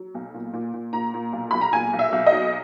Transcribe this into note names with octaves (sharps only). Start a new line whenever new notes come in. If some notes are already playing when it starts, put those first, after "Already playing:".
Already playing: F#3
B1
A#2
A#2
A#2
A#2 A#5
A#2
B1
B1 B5
A#5
A#2 G#5
B1
E5
B1
D#5
F#3